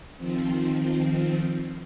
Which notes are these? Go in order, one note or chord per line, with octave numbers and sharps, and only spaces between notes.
D#3 F3 C4